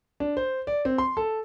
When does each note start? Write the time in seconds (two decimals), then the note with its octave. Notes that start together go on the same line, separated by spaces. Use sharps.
0.20 D4
0.37 C5
0.67 D5
0.85 C4
0.98 C6
1.17 A4